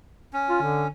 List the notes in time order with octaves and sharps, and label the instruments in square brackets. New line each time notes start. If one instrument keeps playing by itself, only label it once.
[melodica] C#4
[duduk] F4
D3